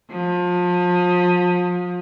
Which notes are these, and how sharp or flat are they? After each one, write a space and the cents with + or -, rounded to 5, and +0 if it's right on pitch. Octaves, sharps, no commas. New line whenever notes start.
F3 +30